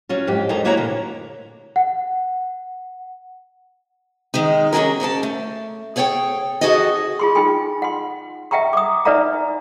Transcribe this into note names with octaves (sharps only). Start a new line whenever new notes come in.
F#3 C#4 F4
F2 G#2 G4
F#2 D#4 G#4 A4 C5 A#5
D2 A#3 E4 F#4 C#5 A#5
A#2 D3
F#5
D#3 G#3 D#4
C#4 D4 F4 G#4 A#4
G#2 C#4 D5 A5
A3
G#4 A4 C#5 F#5 G5
F#4 G#4 A4 D5 D#5
F4 G#4 C6
D#4 F4 G5 G#5 C6
F#5 C6
E5 F#5 G5 A#5 C#6
D6 D#6
D#4 B4 D5 E5 F#5 A#5